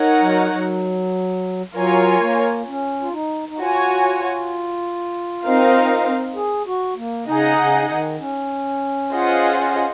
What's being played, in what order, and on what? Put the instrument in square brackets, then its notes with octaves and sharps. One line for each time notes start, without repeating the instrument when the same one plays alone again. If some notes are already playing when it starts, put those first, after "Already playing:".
Already playing: [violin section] D#4 A#4 C#5 F#5
[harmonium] F#3
F#3
[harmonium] F#3 [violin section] F4 A#4 C#5 G#5
[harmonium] A#3
C#4
F4
D#4
D#4
[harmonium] F4 [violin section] F#4 C#5 G#5
[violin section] C4 D#4 A#4 F5
[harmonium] G#4
F#4
A#3
[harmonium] C#3 [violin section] D#4 G#4 D#5 F#5
[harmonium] C#3
D#3
C#4
[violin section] F4 G#4 C5 D#5 F#5